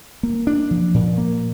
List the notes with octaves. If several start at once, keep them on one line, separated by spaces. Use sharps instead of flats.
A#3
D4
F3
A#2
A#3